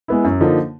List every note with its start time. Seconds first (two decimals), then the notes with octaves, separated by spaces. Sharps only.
0.08 G#3 B3 E4
0.24 F#2
0.41 D3 F3 A#3 D#4